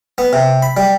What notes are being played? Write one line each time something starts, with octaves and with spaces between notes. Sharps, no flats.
B3
C3
B5
G3